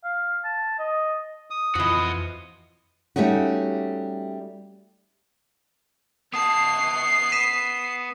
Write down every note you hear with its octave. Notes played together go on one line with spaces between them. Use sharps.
F5
A5
D#5
D#6
F2 E3 F3 F#4 D#5
G3 A3 C#4 D#4 F#4
B3 A5 D#6 C7
B6 D#7 E7